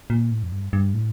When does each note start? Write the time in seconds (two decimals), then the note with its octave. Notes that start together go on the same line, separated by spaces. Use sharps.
0.10 A#2
0.31 A2
0.43 F2
0.52 G2
0.73 G2
0.94 A2